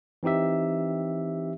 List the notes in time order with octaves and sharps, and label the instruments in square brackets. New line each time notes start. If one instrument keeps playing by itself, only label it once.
[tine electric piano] E3 C4 D#4 G4 E5